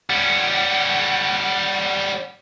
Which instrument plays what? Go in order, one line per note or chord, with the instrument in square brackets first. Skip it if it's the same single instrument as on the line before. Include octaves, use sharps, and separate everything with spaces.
[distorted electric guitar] G3 C#4 [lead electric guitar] F#5